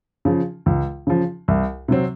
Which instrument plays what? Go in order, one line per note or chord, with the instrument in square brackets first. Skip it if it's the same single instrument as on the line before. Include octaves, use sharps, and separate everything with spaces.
[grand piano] C#3 F3
C#2
C#3 F3
C2
C3 F#3 C4